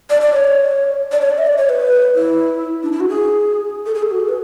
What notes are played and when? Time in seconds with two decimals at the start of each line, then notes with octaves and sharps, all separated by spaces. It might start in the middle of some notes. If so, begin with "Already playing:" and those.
0.10 D5
0.21 D5
0.33 C#5
1.12 D5
1.21 C#5
1.30 D5
1.38 E5
1.47 D5
1.58 C#5
1.69 B4
2.15 E4
2.83 D4
2.92 E4
3.00 F#4
3.09 G#4
3.86 A4
3.94 G#4
4.03 A4
4.11 F#4
4.20 G#4
4.28 B4